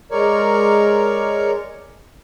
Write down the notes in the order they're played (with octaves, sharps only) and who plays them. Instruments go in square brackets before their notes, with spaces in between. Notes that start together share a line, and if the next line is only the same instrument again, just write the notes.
[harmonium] G#3 A#4 C#5 D5